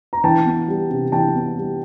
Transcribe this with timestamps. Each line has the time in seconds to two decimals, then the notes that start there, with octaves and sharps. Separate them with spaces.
0.13 A#5
0.24 E3 G5 A5
0.46 B3
0.68 G3
0.90 C3
1.12 E3 G5 A5
1.35 B3
1.57 G3